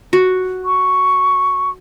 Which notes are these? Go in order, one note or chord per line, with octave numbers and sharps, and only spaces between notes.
F#4
C#6